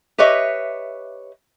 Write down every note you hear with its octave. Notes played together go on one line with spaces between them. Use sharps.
G4 B4 C#5 D#5 E5